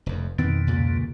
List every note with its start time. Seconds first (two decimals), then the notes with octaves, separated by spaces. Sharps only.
0.06 F1 F2
0.39 F2 B2 D3 D#3 B3 C4
0.67 C#2 A#2 C#3